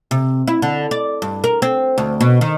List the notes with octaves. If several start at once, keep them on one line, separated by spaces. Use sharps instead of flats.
C3
E4
D3
D5
G2
A#4
C4
D2
B2
D#3